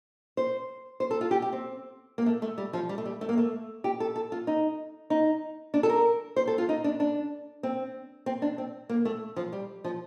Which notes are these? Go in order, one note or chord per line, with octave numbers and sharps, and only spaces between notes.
C5
C5
A4
F4
G4
G4
C4
A#3
A3
A3
G3
F3
G3
A3
G3
A3
A#3
A3
G4
A4
A4
F4
D#4
D#4
D4
A4
A#4
C5
A4
F4
D#4
D4
D4
C4
C4
D4
C4
A#3
A3
F3
G3
F3